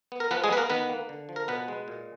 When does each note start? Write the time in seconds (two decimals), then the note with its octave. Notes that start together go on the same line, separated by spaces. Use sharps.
0.12 B3
0.20 A#4
0.31 F3 B3 B4
0.44 G#3 G#4
0.50 B3 B4
0.57 A#3 A#4
0.70 D#3 B3 B4
0.89 A#3
1.09 D3
1.29 F3
1.36 A#4
1.48 B2 B3 B4
1.68 G#3
1.88 A#2